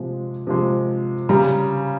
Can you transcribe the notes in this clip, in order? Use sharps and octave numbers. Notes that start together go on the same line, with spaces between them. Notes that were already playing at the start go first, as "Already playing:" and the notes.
Already playing: C3 F3 G#3
C3 F3 G#3
C#3 G3 A#5